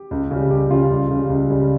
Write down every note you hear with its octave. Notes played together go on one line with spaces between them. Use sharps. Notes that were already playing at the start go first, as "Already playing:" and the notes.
Already playing: G4
C#2
C#3 G3
C#2 G4
C#3 G3 F4
C#2
C#3 G3
C#2
C#3 G3